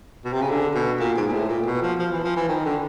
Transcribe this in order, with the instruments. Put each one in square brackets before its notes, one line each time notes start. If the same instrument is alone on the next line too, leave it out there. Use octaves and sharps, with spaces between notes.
[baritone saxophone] B2
C3
C#3
D3
B2
A#2
G#2
G#2
A2
A#2
B2
F3
F3
E3
F3
E3
D#3
D3